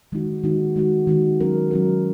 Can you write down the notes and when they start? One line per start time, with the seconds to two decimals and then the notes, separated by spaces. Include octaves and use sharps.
0.12 D#3 G#3 D#4 F#4
0.44 D#3 G#3 D#4 F#4
0.76 D#3 G#3 D#4 F#4
1.07 D#3 G#3 D#4 F#4
1.40 F#3 C#4 A#4
1.71 F#3 C#4 A#4